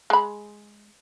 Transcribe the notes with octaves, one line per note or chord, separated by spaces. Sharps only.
G#3 B5